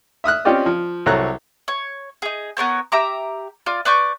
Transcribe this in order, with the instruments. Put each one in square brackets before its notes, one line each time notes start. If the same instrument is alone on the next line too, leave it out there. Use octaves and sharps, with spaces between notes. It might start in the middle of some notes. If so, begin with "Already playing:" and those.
[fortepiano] E5 D#6 F6 F#6
C4 C#4 F4 G4 D5 D#5
F3
C2 F#3 A4 C#5 A#5 F#6
[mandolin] C#5
D#4 G#4
B3 A#4 C#5 G6
G4 E5 A#5 D6
F4 D5
B4 D5 C#6 G6